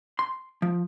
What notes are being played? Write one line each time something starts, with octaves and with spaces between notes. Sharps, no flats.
C6
F3